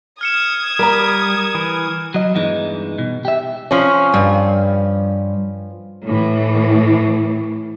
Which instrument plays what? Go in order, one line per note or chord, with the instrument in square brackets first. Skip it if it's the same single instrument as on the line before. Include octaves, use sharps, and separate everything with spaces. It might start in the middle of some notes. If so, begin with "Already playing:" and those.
[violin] D#6 G#6 [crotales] F6 C#7 E7
[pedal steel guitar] G3 [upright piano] A#4 A#5
[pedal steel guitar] E3
[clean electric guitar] F#3 D#5
E2 G2 E3 G#3 D#4
B2
G4 E5
[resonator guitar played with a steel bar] F3 C#4
[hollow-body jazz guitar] G2
[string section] A2 E3